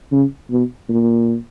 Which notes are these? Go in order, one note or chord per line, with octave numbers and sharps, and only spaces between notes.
C#3
B2
A#2